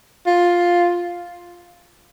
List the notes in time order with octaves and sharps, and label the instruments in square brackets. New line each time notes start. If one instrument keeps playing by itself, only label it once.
[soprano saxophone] F4